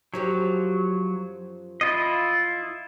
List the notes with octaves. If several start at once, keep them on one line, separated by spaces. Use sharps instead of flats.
F#2 F3 F#3 G4
E4 F4 D#5